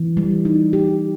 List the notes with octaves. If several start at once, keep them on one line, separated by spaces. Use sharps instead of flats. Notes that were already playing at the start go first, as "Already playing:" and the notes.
Already playing: E3
G3
D#4
G4